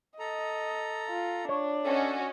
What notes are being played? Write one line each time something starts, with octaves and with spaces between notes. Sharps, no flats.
A4 D#5 A#5
F4
D4 C#5
C#4 F#4 A4 D#5 E5